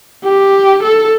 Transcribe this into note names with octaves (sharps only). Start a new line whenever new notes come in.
G4
A4